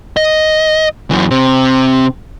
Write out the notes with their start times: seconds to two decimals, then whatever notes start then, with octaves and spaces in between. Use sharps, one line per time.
0.17 D#5
1.11 F#2 E3
1.31 C3 C4